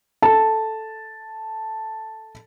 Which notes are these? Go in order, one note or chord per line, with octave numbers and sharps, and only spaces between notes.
A4 A5